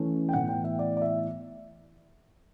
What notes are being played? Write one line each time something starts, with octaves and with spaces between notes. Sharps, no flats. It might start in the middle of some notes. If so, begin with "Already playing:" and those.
Already playing: E3 A3 C#4
G5
A2 E3 B3 F#5
G5
E5
D5
D5
E5